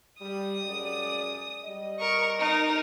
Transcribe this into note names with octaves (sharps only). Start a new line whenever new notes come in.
G3 D#6
F#2 G#3 D5
G3 D#5
A#4 C#6
D#4 A#4